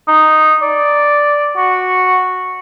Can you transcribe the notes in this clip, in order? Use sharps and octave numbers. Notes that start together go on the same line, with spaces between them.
D#4
D5
F#4